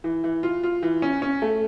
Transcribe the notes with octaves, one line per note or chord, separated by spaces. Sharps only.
E3
E3
F4
F4
E3
C#4
C#4
A3